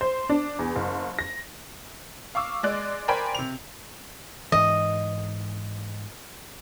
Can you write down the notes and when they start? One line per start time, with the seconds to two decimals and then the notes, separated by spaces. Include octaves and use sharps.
0.01 C5
0.29 D4
0.59 E2
0.76 F#1
1.19 A#6
2.35 F5 C#6 D6 E6
2.63 G#3 D5 F#6
3.08 A#4 C5 D5 G5 G#5 B5
3.35 C3 F7
4.52 G#2 E3 D#5